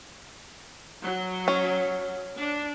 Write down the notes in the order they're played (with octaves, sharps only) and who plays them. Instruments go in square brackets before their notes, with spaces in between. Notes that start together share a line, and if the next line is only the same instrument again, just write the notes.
[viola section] F#3
[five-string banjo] C#4
[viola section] D4